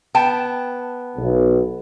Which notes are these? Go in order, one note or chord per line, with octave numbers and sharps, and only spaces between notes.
B3 G5 A5
B1